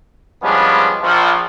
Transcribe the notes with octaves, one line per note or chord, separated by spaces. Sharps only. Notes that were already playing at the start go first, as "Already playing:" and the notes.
F3 G3 G#3 B3 C#4 D4
A#1 F3